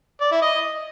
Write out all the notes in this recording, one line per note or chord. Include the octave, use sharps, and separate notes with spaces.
D5
E4
D#5